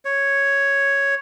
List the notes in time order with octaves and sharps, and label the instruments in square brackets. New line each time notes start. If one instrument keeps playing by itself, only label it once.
[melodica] C#5